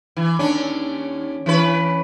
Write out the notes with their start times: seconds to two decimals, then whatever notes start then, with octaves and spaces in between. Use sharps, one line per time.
0.17 E3
0.39 D#2 C#4 D4
1.46 E3 C#4 B4